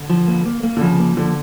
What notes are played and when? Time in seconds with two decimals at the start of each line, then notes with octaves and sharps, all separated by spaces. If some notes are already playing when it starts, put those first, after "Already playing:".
Already playing: D3
0.10 F3
0.28 A#3
0.46 A#3
0.63 A#3
0.77 D3
0.81 C#3 F3
1.00 A#3
1.17 D3 F3